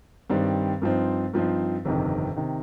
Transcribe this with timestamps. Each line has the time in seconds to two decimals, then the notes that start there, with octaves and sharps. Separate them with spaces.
0.30 G2 D#3 G3 C4
0.82 G2 F3 C4 D#4
1.34 G2 F3 C4 D#4
1.85 G1 F2 C3 D#3
2.36 C3 D#3